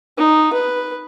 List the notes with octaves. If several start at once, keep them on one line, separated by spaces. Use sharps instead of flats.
D#4
B4